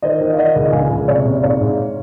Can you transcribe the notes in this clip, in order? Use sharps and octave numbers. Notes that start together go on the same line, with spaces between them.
D#3 C5 D#5
D#3
F5
D#3 D#5 F#5
C#2
C#2 F5 G#5
C#2
C3 C#5
C3
G#2 C#5 F5
G#2